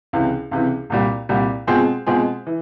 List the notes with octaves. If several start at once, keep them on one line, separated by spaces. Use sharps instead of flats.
C#2 C3 E3
C#2 C3 E3
C2 A#2 G3
C2 A#2 G3
B2 G#3 C4 F4 G#4
B2 G#3 C4 F4 G#4
E3